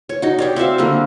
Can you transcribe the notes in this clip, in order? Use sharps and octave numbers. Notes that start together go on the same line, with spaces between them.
C#5
D#4 F#4
G4 C#5 D5
C4 F#4 E5 F5
D3 G3 A#3